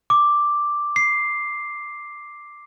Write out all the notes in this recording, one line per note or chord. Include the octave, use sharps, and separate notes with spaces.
D6
C7